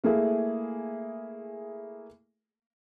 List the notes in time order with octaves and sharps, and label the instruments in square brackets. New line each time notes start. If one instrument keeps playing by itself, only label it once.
[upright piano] A3 A#3 E4 G#4